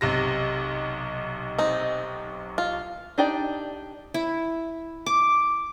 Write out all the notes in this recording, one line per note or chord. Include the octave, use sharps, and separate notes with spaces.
B1 C3 A#6
C4 D#4
F4
D4 D#4 G4 D5
E4
D6